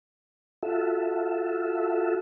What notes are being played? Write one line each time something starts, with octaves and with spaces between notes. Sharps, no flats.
F4 F#4 A4 E5